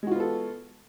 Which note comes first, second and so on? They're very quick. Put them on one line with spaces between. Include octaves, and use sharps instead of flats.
G#3 F#4 F4 B3 A4